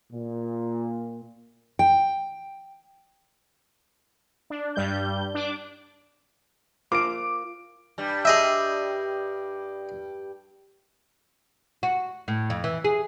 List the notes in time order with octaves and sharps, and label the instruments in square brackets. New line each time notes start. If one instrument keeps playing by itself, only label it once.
[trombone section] A#2
[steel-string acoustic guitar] G5
[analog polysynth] D4
G2 G3 G6
D4 D6
[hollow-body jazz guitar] F4 A#4 C5 [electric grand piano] D6 D7
[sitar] G2 G3
[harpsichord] G#4 D#5 E5
[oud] F#4
A2
F2
E3
G#4